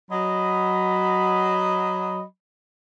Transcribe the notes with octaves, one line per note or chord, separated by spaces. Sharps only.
F#3 D#5 B5